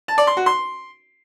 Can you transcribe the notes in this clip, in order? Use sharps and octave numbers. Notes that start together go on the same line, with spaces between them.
A5
D5
C6
F#4
C6